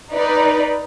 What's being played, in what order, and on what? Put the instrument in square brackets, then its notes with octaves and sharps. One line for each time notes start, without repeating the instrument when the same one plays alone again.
[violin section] D#4 B4 D5